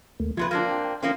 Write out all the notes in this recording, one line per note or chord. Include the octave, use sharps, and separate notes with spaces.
D#2 A3 A#3
E2 C3 F3 F4 B4 G#6
A#3 C4 D4
G5
F3 A#3 C4 C#4